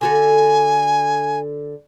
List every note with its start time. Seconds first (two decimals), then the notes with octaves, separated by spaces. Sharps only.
0.01 D3 F#4 A4 G#5